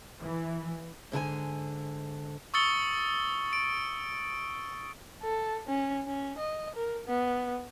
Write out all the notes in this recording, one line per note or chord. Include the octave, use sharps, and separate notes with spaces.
E3
G#2 D3 A#4 G#5
C#6 D#6 E6 A6 C#7 G7
D7
A4
C#4
C#4
D#5
A#4
B3